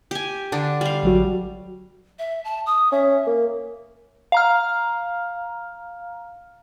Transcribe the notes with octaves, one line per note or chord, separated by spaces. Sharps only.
G4 G#5
D3 D4
G3 F5
A1 F#3 F#4
E5
A5
D#6
C#4 E5
A#3
F5 A#5 F6